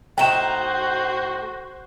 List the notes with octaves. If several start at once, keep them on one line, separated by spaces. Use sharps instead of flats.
A2 D#4 F#4 C5 G5 E7